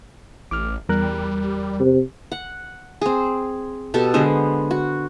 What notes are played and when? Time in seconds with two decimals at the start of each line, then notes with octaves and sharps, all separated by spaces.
0.51 A1 D6 F6
0.89 E2 G3 A#4 F#6
1.80 C3
2.32 F#5
3.01 C4 G#4
3.94 B2 G4 A4
4.14 D3 G#3 B3 C5
4.71 F#4